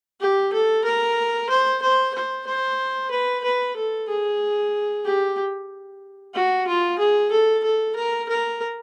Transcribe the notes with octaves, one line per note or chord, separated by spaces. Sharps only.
G4
A4
A#4
C5
C5
C5
C5
B4
B4
A4
G#4
G4
F#4
F4
G#4
A4
A4
A#4
A#4